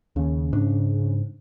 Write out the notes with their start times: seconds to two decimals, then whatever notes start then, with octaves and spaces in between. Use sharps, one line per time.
0.16 D#2 C#3
0.53 G#2 D4